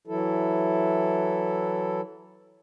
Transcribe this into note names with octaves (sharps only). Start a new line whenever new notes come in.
E3 F#3 E4 A4